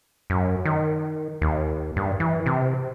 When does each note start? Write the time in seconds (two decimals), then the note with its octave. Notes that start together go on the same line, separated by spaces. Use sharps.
0.30 F#2
0.65 D#3
1.41 D#2
1.96 G2
2.20 E3
2.46 C3